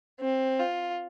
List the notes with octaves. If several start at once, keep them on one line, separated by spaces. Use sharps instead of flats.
C4
F4